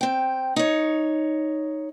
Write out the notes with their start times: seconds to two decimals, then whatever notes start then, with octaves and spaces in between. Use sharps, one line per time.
0.01 C4 G5
0.56 D#4 C#5